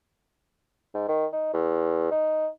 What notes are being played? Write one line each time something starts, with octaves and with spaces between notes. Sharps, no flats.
G#2
D#3
D#4
E2
D#4